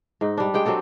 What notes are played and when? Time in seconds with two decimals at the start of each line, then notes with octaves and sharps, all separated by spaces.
0.21 G#2 D#4
0.37 G3 D4
0.54 G#3 G4 G5
0.65 F#3 C4 G4 A4